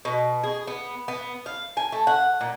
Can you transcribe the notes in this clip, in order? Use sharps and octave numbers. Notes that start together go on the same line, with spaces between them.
B2
G#4
B3
B3
F5
G#5
A3
F#5
A#2